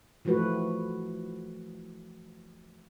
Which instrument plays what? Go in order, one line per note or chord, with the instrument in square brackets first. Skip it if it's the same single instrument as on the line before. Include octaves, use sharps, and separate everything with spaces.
[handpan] E3 F3 A3 F#4 B4